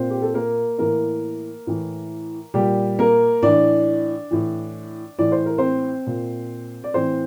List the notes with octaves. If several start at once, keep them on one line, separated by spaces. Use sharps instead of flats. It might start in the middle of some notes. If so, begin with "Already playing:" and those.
Already playing: A#2 C4 C5
G4
A4
A#3 A#4
A2 E3 A#3 A#4
A2 E3
A#2 G3 G4
A#3 A#4
A2 E3 D4 D5
A2 E3
A2 E3 D5
C5
A#4
C4 C5
A#2
D5
A2 E3 C4 C5